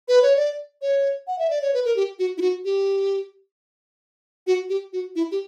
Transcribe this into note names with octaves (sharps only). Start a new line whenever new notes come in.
B4
C#5
D5
C#5
F#5
E5
D5
C#5
B4
A#4
G4
F#4
E4
F#4
G4
F#4
G4
F#4
E4
G4